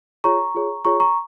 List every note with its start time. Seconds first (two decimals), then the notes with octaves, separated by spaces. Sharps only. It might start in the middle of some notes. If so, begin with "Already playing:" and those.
0.24 F4 G#4 C#5 A#5 C#6
0.55 F4 G#4 C#5
0.85 F4 G#4 C#5 A#5 C#6
1.00 A#5 C#6